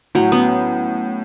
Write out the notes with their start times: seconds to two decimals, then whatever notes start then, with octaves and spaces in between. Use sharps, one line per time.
0.15 A2 F#3
0.32 B3 C#4